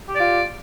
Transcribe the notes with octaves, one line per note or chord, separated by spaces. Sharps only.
F4 G4 D5